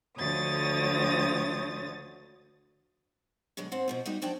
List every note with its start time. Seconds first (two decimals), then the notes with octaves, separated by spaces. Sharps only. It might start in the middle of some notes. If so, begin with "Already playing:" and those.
0.18 D2 D3 F3 C#5 D#6 A6
3.57 B2 D3 F#3 G#3
3.72 G#2 C4 F#5
3.88 B2 F3 C4
4.06 G3 D#4 F#4 D#5
4.22 F3 F#3 D4 D5 G5 A5